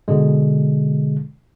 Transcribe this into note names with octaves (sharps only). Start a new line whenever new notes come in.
B2 D3 G#3